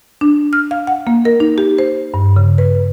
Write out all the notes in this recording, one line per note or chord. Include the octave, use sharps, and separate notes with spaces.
D4
F6
F5
F#5
A#3
A#4
D#4
G4
C5
G2
C#3
B4